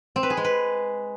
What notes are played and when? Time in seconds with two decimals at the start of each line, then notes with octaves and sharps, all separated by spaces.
0.16 C4
0.23 B4
0.30 G#4
0.37 G#3
0.44 B4